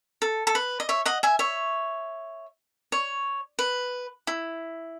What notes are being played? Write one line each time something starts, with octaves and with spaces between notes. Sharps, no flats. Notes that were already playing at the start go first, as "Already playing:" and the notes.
A4
A4
B4
D#5
C#5 E5
D#5 F#5
E5 G#5
C#5 E5
C#5
B4
E4